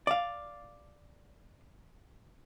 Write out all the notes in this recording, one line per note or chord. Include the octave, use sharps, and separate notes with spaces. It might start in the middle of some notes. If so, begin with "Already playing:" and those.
D5 F5